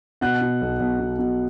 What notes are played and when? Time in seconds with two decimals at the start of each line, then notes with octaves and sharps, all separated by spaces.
0.21 B2 F#5 F#6
0.41 B2
0.61 B1
0.80 B1
1.00 B2
1.19 B2